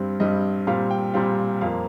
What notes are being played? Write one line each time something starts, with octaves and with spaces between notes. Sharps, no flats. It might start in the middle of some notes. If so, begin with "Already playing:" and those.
Already playing: G2 G3 C4
G2 G3 C4 D#5
A#2 G3 C4 F5
G5
A#2 G3 C4 F5
F2 F3 A#3 F5